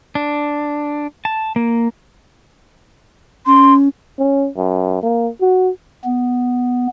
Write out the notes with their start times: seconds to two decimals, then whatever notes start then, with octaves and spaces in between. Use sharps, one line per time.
0.15 D4
1.25 A5
1.56 A#3
3.46 C#4 C6
4.19 C#4
4.57 F#2
5.03 A#3
5.41 F#4
6.05 B3